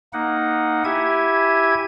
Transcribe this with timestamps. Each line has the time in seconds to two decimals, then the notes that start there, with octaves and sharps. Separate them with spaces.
0.13 A#3 D#4 F#5
0.85 E4 G4 E5 G#5 G#6